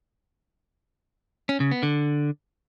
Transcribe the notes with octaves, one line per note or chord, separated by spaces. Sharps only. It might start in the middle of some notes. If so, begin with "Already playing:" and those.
C#4
C#3
B3
D3